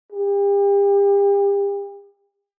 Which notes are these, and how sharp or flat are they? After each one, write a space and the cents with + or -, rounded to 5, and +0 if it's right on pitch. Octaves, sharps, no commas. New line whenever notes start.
G4 +35